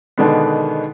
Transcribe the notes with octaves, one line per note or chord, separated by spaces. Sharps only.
B2 D3 D#3 G#3 B3